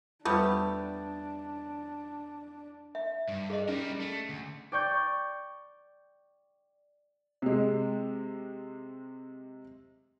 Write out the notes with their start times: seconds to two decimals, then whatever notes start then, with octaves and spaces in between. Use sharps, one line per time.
0.25 E2 G3 A3 B3 D4 F4 G4 B4
2.95 E5
3.28 G2
3.50 G#4 D#5
3.69 G3 C#4 A#4
4.00 A3
4.29 D2
4.72 D5 G5 C#6 G6
7.42 C3 G#3